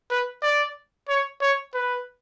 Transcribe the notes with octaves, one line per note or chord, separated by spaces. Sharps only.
B4
D5
C#5
C#5
B4